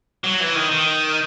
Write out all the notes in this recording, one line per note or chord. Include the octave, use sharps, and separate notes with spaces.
F#3
E3
D#3
D#3